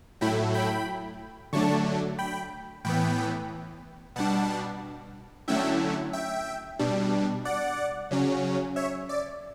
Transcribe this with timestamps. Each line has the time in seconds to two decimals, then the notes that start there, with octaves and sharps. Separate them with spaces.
0.21 A2 F#3 A3 E4 G5 B5
0.54 G5 B5
1.53 D3 F#3 A3 D4 A5 C#6
2.19 G5 B5
2.85 A2 E3 B3 G5 B5
4.16 B2 G3 D4 F#5 A5
5.48 D3 F#3 A3 C#4 E4 E5 G5
6.13 E5 G5
6.79 B2 G3 D4
7.45 D5 F#5
8.11 C#3 F#3 C#4
8.76 C#5 E5
9.09 D5